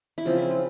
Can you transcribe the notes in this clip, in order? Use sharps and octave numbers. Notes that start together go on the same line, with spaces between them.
E4
C#3 F3 C4 F4
E4
F4